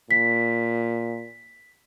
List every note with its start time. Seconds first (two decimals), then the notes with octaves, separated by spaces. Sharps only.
0.11 A#2 B6